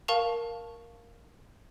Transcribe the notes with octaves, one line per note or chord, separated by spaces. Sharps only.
A#4 F5 A5 C#6 F7